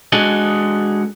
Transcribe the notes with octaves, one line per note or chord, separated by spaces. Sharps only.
G#3 D4 F#4 G#4 A4 D#5